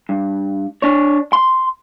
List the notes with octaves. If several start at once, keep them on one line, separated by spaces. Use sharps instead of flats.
G2
D4 C#5
C6